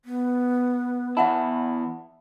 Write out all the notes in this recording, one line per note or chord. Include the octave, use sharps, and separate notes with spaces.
B3
E2 E4 E5 F#5 A5